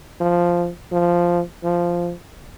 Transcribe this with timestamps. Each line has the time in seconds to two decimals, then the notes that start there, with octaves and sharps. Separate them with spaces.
0.20 F3
0.92 F3
1.64 F3